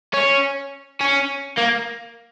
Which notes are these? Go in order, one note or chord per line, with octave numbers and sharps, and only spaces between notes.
C#4
C#4
A#3